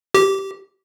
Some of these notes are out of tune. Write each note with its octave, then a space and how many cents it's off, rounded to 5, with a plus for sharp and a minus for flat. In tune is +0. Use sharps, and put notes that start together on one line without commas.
G4 -15